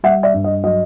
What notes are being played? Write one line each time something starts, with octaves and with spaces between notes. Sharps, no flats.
G3 E5 F#5
D5 E5
G2
D#5
F#3 D#5